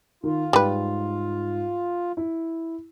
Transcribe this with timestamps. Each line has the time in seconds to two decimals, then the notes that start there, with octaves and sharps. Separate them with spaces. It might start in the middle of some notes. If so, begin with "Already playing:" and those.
0.24 D#3 F4
0.53 G#2 G3 B4
2.17 E4